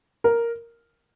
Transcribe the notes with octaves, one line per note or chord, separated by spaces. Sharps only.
A#4